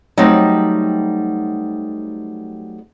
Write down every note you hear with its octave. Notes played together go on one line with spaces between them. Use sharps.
F#3 G3 A3 C4 D#4